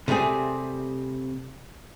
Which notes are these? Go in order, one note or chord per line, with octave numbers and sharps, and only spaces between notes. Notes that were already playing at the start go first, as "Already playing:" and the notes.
C3 G3 A3 C4 G#4